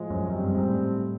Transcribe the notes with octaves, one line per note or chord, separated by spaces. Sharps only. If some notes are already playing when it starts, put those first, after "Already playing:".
Already playing: A2 F3 G#3
F#2
F#2 D3 G3 C4
G2
G#2
A2